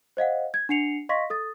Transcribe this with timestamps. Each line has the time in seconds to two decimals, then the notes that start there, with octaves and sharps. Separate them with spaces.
0.17 C5 D#5 F5 F#5
0.54 G#6
0.69 D4 F#5 C7 C#7 F7
1.09 D#5 F5 C6 C#6 A#6 B6
1.30 A4 D#6 A6